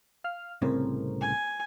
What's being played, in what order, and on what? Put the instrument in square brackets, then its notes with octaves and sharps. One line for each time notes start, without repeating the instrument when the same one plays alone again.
[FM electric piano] F5 F6
[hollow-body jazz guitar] C2 A2 C#3 [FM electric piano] C4 A#4 C5
[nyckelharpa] G#5